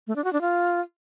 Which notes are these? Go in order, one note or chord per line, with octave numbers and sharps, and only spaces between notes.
A3
D4
F#4
D4
F4